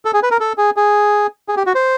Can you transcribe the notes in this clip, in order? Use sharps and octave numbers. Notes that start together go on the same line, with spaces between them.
A4
G#4
B4
A#4
A4
G#4
G#4
G#4
G4
F#4
C5